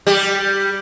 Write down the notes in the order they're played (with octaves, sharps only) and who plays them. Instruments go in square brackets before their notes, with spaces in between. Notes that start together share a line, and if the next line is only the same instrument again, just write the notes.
[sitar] G3 G4